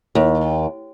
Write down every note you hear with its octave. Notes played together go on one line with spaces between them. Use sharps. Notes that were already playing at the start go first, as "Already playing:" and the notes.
D#2